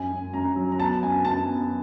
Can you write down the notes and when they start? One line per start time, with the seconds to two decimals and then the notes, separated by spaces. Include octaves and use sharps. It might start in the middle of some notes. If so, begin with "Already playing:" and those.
Already playing: F#2 G#5
0.11 F#2
0.34 F#2 A#5
0.56 F#3
0.72 A#5
0.79 B3 A5
1.03 F#2 G#5
1.25 F#2 A5
1.48 B3